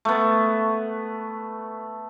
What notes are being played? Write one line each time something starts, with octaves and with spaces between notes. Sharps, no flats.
A3 B3